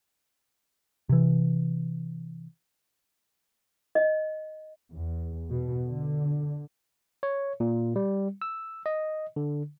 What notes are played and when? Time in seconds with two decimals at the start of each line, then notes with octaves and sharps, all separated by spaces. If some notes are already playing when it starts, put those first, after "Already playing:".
1.09 C3 E3
3.95 D#5
4.92 E2
5.50 B2
5.86 D3
7.23 C#5
7.60 A#2
7.96 G3
8.42 E6
8.86 D#5
9.36 D3